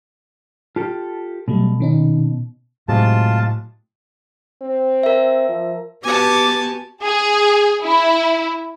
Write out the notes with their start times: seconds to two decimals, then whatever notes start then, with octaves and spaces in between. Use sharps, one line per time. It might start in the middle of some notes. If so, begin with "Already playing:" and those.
0.76 F4 G4 A4 A5
1.48 B2 F#3 G3 A3
1.80 D#3 C#4 D#4
2.88 A2 C3 F#3 G#3 F4 A5
4.62 C4
5.03 A#4 E5
5.49 F3
6.04 B3 F#4 G4 G#5 A5 D6
7.03 G#4
7.82 E4